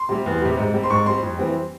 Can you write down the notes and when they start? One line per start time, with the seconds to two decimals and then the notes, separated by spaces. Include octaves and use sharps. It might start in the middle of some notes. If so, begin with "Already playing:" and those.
Already playing: C6
0.09 C3 G3
0.26 E2
0.41 C3 G3
0.57 G#2
0.74 G3 C4
0.83 C6
0.90 G#2 C#6
1.06 G3 C4 C6
1.23 F2
1.38 E3 G3 C4